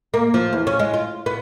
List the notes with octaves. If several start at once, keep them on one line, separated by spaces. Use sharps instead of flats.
A#3
F3
E2
C#4
G#3
F4
B3